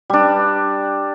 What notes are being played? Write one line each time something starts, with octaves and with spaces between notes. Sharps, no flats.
G3 D4